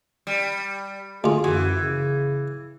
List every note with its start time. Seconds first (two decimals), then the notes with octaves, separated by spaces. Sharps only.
0.27 G3
1.24 D2 F4 G#4
1.44 F#2 E3 F#4
1.79 C#3